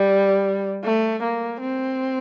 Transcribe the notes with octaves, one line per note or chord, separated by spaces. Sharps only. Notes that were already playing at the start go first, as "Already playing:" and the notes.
Already playing: G3
A3
A#3
C4